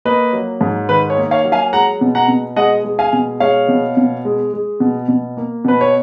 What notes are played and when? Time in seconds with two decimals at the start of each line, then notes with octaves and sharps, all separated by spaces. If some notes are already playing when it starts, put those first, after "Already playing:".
0.05 A#3 B4 D#5
0.33 F#3
0.61 G#2
0.89 D#3 B4
1.10 C#5
1.17 A#3
1.31 C#5 F5
1.45 F#3
1.52 F5 G#5
1.73 G#3 F#5 A#5
2.01 B2
2.15 F#5 A#5
2.28 B2
2.56 G#3 D#5 F#5
2.84 G#3
2.99 F5 G#5
3.13 B2
3.40 G#3 C#5 F5
3.68 B2
3.97 B2
4.25 G#3
4.53 G#3
4.80 B2
5.08 B2
5.37 A#3
5.65 B2 B4
5.81 C#5